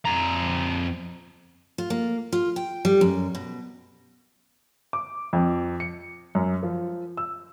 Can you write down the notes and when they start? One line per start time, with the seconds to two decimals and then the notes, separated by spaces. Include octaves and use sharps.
0.06 F2 A#5
1.78 F4
1.90 A#3
2.32 F4
2.56 G5
2.85 G3
3.01 F#2
3.35 B2
4.93 D6
5.33 F2
5.80 C#7
6.35 F#2
6.63 F3
7.17 E6